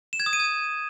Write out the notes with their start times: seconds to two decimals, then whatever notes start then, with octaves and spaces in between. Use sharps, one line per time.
0.13 E7
0.20 G#6
0.26 D#6
0.33 D#7
0.40 G#6